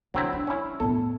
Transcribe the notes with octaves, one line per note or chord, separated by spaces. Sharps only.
D3 F#3 C4 E4
D4
C#4 E4
A2 B3 A4